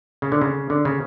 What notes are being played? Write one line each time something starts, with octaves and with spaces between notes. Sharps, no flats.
C#3
D3
C#3
D3
C#3